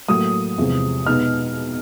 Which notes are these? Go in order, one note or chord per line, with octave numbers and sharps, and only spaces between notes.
A2 F#3 A#3 D#6
E2 C3 F3 G#3
B2 G#3 B3 D#4 F6